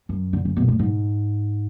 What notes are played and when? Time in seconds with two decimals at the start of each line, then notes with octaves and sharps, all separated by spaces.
0.09 F#2
0.33 D3
0.45 C#3
0.57 B2
0.68 A2
0.79 G#2